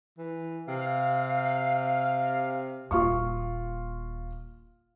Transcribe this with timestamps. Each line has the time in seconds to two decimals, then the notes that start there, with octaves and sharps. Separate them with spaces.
0.18 E3
0.68 C3 F5
2.91 D#1 A#3 F4 F5 C#6